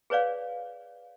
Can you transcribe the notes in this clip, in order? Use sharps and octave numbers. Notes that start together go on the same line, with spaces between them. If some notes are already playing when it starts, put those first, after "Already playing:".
G#4 B4 C#5 D5 F5